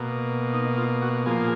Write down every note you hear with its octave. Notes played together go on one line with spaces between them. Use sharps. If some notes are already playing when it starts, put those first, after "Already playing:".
Already playing: B2 A#3
D#4
F4
F#4
A#2 F3 A#3 G#4